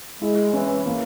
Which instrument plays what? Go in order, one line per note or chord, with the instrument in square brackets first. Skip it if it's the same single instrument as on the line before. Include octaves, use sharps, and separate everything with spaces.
[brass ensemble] G#3 [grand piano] E4
[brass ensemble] E3 [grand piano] C#4
[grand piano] A#3